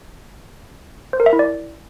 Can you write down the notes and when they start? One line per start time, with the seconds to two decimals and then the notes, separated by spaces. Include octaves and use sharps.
1.13 C5
1.20 A#4
1.26 E5
1.33 E4
1.39 D5